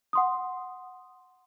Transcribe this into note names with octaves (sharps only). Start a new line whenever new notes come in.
F#5 C6 D#6